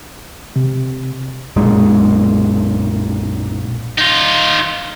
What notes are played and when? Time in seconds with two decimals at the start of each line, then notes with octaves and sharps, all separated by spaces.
0.56 C3
1.56 B1 F#2 A#2 G#3
3.98 D#4 F4